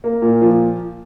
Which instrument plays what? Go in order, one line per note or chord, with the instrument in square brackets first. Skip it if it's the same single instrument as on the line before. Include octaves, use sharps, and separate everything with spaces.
[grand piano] A#3
A#2
F3